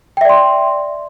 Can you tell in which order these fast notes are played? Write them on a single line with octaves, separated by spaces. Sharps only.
G5 E5 D5 C6